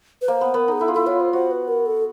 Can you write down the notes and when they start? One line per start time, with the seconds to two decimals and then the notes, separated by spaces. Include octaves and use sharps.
0.22 B4
0.28 A#3 C5
0.41 B3
0.54 B3 A#4
0.68 D#4 G#4
0.80 E4 A4
0.88 F4
0.94 E4 A4
1.06 F4 C#5
1.20 C5
1.33 F#4 C5
1.51 B4
1.68 A#4
1.86 A4